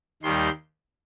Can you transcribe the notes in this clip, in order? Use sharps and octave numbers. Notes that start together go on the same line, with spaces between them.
D#2 D#3 G3 C6